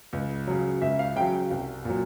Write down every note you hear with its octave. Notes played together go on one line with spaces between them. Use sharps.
C#2
C#3 F#3
C#2 E5
F5
C#3 F#3 G5
C2
A#2 F#3